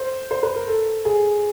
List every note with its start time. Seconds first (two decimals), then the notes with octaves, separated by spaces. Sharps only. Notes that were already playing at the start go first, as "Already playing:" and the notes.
Already playing: C5
0.31 C5
0.43 B4
0.56 A#4
0.67 A4
1.05 G#4